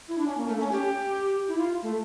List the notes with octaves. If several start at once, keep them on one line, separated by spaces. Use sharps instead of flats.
E4
D4
C#4
A#3
A3
C#4
G4
E4
F4
A3